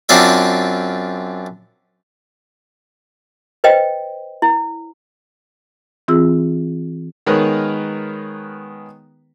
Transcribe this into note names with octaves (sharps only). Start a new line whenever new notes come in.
F#2 C4 D4 F4 E5
B4 C5 D#5 G5
E4
E3 C4 F4 G#4 E6
D#3 G#3 B3 A#4 B4 C#5